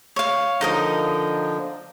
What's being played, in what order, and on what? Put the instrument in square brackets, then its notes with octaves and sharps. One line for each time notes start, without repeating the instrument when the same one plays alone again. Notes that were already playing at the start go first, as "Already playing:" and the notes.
[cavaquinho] C#5 F5
[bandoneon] D3 F3 [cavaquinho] D#4 A#4 D#5